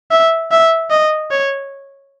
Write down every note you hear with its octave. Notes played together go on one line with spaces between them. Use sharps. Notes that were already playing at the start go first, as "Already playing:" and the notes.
E5
E5
D#5
C#5